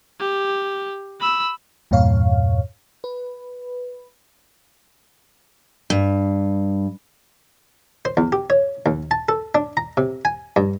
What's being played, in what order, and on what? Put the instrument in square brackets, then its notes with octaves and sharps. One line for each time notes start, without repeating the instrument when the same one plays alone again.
[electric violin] G4
B5 E6
[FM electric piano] E2 G2 A#2 C#5 F5
B4
[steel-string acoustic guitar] G2
[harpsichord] C5
E2
G4
C#5
D#2
A5
A4
D4
A#5
C3
G#5
G2